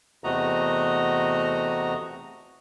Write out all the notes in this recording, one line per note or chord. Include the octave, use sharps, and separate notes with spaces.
E2 C3 A3 F#4 D#5 A#5